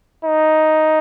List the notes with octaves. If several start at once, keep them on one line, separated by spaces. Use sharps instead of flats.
D#4